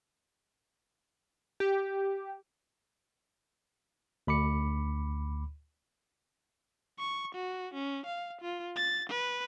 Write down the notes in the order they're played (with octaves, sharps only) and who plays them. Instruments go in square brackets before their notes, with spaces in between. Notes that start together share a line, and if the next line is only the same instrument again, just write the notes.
[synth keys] G4
[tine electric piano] D2 B5 D6 C#7
[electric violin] C#6
F#4
C#4
F5
F4
A6
B4